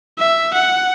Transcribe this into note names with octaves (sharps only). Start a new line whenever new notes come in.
E5
F#5